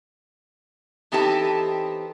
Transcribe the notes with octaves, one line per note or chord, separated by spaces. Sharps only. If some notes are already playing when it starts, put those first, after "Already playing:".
E3 B3 C4 D#4 G4 A4